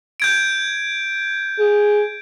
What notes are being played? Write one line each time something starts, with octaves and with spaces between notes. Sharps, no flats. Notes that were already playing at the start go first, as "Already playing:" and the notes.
G6 G#6 D7
G#4